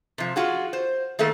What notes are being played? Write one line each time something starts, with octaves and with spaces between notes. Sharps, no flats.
C3 F3
F4 F#4 G#4
C5
D#3 A3 A#3 A4